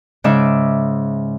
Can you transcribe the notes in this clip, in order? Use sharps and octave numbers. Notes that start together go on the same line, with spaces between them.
G#2 C#3 D#4 E5 D6